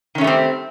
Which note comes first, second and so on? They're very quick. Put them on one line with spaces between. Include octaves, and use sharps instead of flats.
D#3 C#4 A3 G3 C4